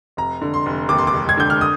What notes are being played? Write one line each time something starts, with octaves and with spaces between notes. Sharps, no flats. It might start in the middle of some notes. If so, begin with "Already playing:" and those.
F1 A#5
D3
C6
F1
D#2 D6
C6
D6
F1
G#6
D3 G6
F6
D#6